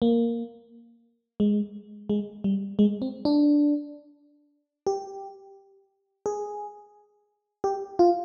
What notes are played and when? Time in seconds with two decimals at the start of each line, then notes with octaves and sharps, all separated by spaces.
0.02 A#3
1.40 G#3
2.09 G#3
2.44 G3
2.79 G#3
3.02 C4
3.25 D4
4.87 G4
6.26 G#4
7.64 G4
7.99 F4